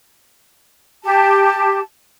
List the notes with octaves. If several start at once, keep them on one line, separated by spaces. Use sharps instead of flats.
G4 A5